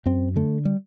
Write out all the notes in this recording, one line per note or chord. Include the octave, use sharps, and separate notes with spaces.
F#2 C4
D3 A3
G3